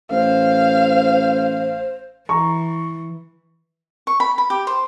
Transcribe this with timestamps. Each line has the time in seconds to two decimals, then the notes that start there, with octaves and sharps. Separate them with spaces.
0.11 A1 C5 F5
2.29 E3 A#5 C#6
4.07 C#6
4.20 B5
4.38 B5
4.50 G4
4.67 C5